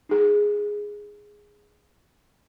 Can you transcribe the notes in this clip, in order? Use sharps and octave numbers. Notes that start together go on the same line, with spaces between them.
D#4 G#4